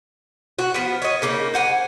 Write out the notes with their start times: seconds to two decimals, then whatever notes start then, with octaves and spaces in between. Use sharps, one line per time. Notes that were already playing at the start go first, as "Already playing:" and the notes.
0.59 F#4
0.74 F3 B3
1.02 C#5 D#5
1.22 C#3 A#3 D#4
1.54 C5 F#5 G#5